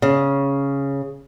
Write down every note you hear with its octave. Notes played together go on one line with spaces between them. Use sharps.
C#3